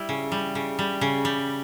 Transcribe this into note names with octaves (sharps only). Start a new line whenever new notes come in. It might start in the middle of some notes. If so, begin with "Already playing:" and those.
Already playing: G3 E4
C#3
G3
C#3
G3
C#3
G3